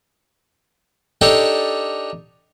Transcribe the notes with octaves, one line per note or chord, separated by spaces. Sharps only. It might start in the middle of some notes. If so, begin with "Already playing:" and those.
D4 D#4 G4 A4 C#5